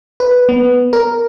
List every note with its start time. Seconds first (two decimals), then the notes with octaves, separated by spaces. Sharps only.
0.20 B4
0.49 B3
0.93 A#4